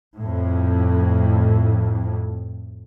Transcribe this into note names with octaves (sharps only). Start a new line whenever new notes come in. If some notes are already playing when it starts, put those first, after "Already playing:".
F2 A2